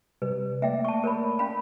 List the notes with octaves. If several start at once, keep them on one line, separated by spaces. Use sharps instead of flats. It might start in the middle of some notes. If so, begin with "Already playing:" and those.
C3 G3 B4
A3 A#3 D5 E5 G5
A5 C#6
A#4 C#5 B5
C#4 F5 B5